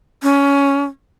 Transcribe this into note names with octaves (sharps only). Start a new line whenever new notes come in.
C#4